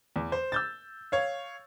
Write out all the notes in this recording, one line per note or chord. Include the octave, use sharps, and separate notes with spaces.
E2
C5
E6 G6 A6
C#5 F5